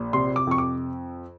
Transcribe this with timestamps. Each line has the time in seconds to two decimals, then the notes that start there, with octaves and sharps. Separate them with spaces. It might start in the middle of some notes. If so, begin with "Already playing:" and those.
Already playing: A#1
0.13 C3 C6
0.36 D6
0.47 F2 C#6
0.58 D6